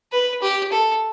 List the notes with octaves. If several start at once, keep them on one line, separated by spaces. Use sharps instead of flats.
B4
G4
A4